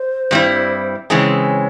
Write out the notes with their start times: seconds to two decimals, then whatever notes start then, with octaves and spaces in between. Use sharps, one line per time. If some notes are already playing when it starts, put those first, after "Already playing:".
Already playing: C5
0.31 G2 G3 C4 E4
1.09 C#3 E3 G#3 C4 C#5